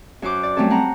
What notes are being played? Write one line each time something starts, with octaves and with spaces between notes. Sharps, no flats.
F#2 F#4 C5 D6 F#6
D5
F#3 G3 A3 C4 C#4 A4
C4 F#5 A#5